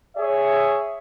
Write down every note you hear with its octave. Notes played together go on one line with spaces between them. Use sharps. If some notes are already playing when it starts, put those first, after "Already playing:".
G#4 C#5 E5